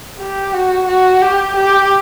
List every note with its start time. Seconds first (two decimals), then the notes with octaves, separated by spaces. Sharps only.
0.20 G4
0.54 F#4
0.88 F#4
1.22 G4
1.56 G4